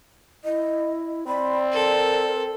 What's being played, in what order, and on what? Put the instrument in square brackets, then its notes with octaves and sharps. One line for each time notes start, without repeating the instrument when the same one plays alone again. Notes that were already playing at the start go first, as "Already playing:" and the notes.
[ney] E4 [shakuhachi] D#5
[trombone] C4 [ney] D5 [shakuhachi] B5
[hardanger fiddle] A4 [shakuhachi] A#4